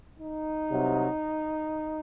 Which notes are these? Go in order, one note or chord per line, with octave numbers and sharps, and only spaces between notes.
D#4
C2 C3 F#3